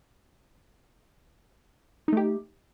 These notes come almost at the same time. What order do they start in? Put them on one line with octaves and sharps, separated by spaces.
D#4 A3 G4